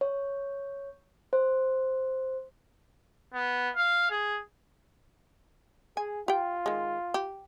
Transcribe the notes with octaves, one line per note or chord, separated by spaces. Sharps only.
C#5
C5
B3
F5
G#4
G#4 G#5
F4 G4 G5
D#3 G#3
G4